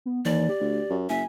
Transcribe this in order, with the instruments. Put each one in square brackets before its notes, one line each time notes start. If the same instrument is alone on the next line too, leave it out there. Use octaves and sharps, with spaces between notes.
[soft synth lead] B3
[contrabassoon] D#2 [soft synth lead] E3 [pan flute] D5
[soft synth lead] G4
[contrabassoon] D2
F#2
[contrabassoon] F#1 [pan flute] E5 [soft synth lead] G#5